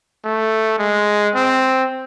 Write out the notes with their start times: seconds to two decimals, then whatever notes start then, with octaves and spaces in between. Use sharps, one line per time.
0.24 A3
0.79 G#3
1.35 C4